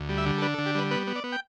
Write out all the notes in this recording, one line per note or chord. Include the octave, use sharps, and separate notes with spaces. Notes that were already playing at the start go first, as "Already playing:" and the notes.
Already playing: D2
G3
E5
D3
A4
D4 B4
A4
D3
G4
G3 B4
B3 B4
B3
D5
B3
G5